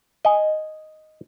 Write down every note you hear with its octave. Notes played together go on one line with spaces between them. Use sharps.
D#5 G#5